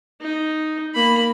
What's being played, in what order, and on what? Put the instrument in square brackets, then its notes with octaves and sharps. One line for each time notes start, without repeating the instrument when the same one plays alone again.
[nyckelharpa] D#4
A#3 B5